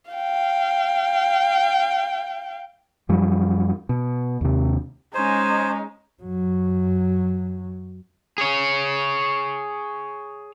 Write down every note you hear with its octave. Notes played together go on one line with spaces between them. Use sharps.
F5 G5
F#2 F3 G3
B2
D#2 C3
G#3 C#4 D#4 C5 G#5
F#2 F#3
G#4 C#5